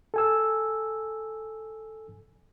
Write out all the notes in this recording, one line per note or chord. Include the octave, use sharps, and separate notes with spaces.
A4 G#5 E6